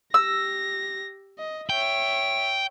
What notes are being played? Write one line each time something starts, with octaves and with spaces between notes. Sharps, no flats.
G4 E6 A#6
D#5
C#5 E5 G5